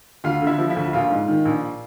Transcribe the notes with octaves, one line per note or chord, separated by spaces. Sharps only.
D2 F4 F5
D3
E4 E5
F3
E4 E5
D2
A#1 F4 F5
G#2
D#3
A#1